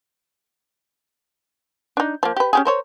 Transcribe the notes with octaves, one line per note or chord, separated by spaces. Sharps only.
D4 D#4
F3 A#3
G4 B4
C#4 G4 G#4
A#4 C5 C#5